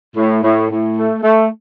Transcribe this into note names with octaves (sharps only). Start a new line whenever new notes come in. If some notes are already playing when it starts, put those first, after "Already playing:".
A2
A2
A2
A3
A3